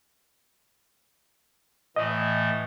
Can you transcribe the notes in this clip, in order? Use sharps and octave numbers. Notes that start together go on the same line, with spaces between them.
A2 E3 A3 D#5